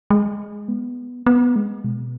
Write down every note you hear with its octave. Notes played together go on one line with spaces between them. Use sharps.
G#3
B3
B3
G#3
B2